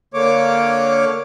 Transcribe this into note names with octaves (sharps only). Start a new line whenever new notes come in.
D3 A#3 C#5 D6